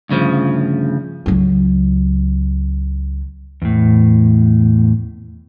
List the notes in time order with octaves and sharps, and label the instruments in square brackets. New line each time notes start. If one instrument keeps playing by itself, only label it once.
[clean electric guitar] D2 G2 C#3 F3
[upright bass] C#2 F#3
[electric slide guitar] E2 A2